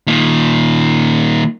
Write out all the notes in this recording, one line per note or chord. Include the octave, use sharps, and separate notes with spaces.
A#2 D#3